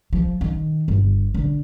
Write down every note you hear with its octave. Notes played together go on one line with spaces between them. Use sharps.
F3
D#3
G1
D3